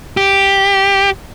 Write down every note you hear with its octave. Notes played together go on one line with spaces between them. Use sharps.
G4